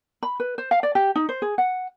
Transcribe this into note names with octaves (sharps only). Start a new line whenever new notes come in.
B5
B4
C5
F5
D5
G4
D#4
C5
G#4
F#5